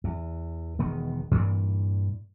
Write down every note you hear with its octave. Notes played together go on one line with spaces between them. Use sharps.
E2
E1 D#3 B3
G2 A#2 E3